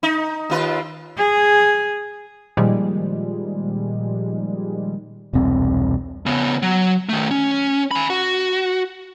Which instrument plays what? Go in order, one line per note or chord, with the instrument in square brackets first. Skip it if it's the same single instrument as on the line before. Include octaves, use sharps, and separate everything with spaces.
[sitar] D#4
D#2 F4 B4
[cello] G#4
[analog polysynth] A#2 D#3 F3 G3 G#3
[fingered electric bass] E1 C2 C4
[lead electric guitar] C#3 B3
F#3
D#3 A3
C#4
G#5 B5
F#4